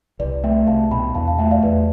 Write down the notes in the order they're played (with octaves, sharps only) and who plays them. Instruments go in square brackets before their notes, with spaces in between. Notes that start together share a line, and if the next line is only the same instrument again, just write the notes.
[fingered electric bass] C2 [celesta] B4 D5
[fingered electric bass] A3 [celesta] E5 G5
[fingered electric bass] C2 [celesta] F5 A5
[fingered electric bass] B2 [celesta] G5 B5
[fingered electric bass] E2 [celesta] F5 A5
[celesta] F5 A5
[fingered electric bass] A3 [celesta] E5 G5
[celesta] D5 F5
[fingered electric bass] E2 [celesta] B4